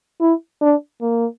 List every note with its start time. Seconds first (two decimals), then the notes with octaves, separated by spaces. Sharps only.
0.20 E4
0.62 D4
1.01 A#3